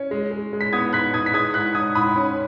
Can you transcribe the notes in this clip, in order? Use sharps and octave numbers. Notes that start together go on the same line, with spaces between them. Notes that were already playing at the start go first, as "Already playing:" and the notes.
Already playing: C#4
G#3
G#3
G#3
B6
B3 D#6 G#6
G#2 F#6 B6
G#2 D#6 G#6
B6
G#3 D#6 G#6
G#2 F#6 B6
G#2 D#6 G#6
G#2 B5 D#6
C#4